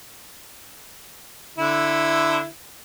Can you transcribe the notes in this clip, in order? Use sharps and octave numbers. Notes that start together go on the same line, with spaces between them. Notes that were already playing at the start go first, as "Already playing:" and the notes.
D3 E4